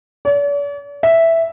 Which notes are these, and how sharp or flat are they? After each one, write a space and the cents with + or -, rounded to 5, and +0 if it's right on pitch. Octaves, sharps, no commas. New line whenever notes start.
D5 -45
E5 +0